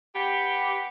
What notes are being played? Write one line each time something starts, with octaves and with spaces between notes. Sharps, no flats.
B3 G4